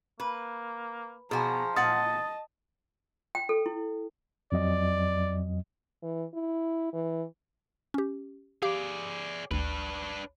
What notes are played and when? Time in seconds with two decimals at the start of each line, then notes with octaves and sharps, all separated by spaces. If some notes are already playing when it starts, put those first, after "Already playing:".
0.20 A#3 B4
1.31 B2 F3 F#4 G#4 G#5 A#5
1.76 A#2 D#5 F#5 A5 D#6 A6
3.35 G5
3.49 A4
3.66 E4
4.52 F2 F#3 D5 D#5
6.03 E3
6.34 E4
6.93 E3
7.94 C#4 G4
8.62 G4 G#4 D5 F5 D6
9.51 G#1 D2 D4 B4